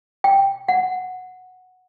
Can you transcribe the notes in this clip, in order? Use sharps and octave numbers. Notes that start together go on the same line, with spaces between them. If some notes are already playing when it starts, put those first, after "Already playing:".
G5
F#5